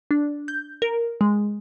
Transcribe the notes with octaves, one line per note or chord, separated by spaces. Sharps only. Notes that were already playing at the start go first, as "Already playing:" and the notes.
D4
G6
A#4
G#3